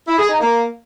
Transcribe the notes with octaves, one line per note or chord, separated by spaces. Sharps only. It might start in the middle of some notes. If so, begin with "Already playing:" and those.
E4
G#4
D#4
A#3